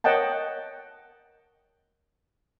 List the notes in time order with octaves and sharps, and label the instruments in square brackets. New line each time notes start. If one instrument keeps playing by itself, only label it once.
[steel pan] A#4 C#5 D#5 F#5 G5 A5